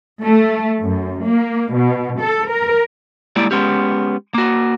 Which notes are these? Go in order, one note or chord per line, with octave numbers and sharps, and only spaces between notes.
A3
F#2
A#3
B2
A4
A#4
G3 G#3 A#3 E4 D5
G#3 B3 C#4 G4
A#3 F#4